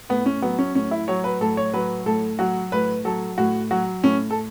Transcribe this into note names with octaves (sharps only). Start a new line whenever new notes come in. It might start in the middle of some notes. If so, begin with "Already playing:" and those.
A2 B3
C#4
F#3 B3
C#4
A2 C#4
E4
F#3 C#5
B4
A2 A4
C#5
F#3 B4
A2 A4
F#3 F#4
A2 B4
F#3 A4
A2 F#4
F#3 F#4
A2 C#4
A4